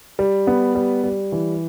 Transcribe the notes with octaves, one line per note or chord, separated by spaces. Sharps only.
G3
B3
G3
G3
E3